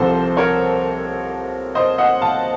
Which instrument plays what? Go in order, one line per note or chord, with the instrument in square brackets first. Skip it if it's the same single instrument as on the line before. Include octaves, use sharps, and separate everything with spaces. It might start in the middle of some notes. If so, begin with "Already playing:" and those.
Already playing: [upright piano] C2 C3 F3 A4 C5
A#4 C#5
C5 D#5
D#5 F#5
F5 A5